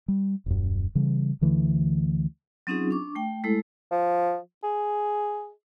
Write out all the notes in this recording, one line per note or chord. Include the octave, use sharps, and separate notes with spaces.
G3
D#1 F#2
C#3 E3 G3
D2 D3 E3 A3
F#3 C4 C#4 D#4 F4 G#4
D4 C#6 D6
A3 G5
G#3 A3 E4 A4
F3
G#4